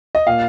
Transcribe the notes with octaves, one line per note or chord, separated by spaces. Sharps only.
D#5
A#2 F5